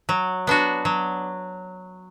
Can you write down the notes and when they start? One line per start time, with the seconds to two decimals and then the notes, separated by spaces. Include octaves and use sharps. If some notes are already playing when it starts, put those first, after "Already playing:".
0.09 F#3
0.47 B3 D4 F#4
0.85 F#3